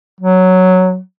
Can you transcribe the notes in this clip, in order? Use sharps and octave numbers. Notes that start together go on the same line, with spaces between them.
F#3